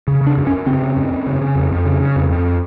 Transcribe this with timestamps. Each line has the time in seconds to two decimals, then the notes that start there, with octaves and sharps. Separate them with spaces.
0.08 C#3
0.21 C#3
0.27 D4
0.37 F#2
0.47 C#4
0.51 F#2
0.66 C#3 C4
0.82 C#3
0.97 F#2
1.12 F#2
1.26 C#3
1.41 C#3
1.56 F2
1.71 F2
1.85 C#3
2.01 C#3
2.16 F2
2.30 F2